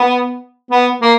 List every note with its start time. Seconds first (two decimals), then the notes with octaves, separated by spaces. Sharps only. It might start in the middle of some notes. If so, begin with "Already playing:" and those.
Already playing: B3
0.71 B3
1.02 A#3